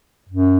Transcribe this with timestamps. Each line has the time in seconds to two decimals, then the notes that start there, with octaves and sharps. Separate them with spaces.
0.29 F#2